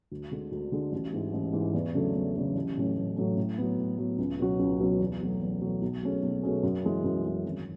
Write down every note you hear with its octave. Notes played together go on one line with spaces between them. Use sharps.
D2
D3 G#3 D4
D2
D3 G#3 D4
A1
G#2 E3
A1
G#2 E3
E2
C#3 F#3 A3 D4
E2
C#3 F#3 A3 D4
A1
A2 F#3 A3 C#4
A1
A2 F#3 A3 C#4
A2
F#3 B3
A2
F#3 B3
C#2
B2 F#3 C#4 F#4
C#2
B2 F#3 C#4 F#4
E2
B2 F#3 A3
E2
B2 F#3 A3
B1
B2 A3 C#4 G#4
B1
B2 A3 C#4 G#4
F#2
E3 G#3
F#2
E3 G#3
G#1